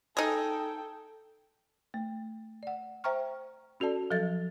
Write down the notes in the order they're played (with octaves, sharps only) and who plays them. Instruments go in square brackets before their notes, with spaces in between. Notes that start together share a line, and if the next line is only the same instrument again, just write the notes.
[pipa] D#4 G#4 [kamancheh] A4 G5
[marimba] A3
D5 F#5
C5 E5 G5 A#5 C#6 F6
C#4 F#4 A4 D5 A5
F3 F#3 A4 D#5 A6